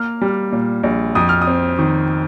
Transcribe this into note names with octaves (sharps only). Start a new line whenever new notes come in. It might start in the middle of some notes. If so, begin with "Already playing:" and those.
Already playing: A#3 F6
G3
A#2
A#1
F2 D#6
F6
D#6
C4
D#3